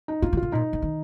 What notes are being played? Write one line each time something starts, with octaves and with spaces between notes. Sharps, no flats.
D#4
D4 F4
D#3
F4
D3
A#2 D#4
D3
D#3